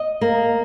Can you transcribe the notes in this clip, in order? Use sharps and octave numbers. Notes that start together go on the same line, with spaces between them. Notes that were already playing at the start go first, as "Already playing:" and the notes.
Already playing: D#5
A#3